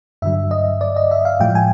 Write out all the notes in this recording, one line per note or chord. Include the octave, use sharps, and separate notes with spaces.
G2 D3 F#3 E5
D#5
D5
D#5
E5
F5
A2 F3 G#3 G5
G#5